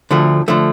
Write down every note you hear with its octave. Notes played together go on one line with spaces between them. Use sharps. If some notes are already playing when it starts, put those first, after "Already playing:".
D2 D3 F3 A3
D3 F3 A3